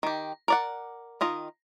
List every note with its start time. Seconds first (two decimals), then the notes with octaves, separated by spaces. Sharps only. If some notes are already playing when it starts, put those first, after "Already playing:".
0.03 D#3 G4
0.48 A#4 D5 F#5
1.21 D#3 F4 D#5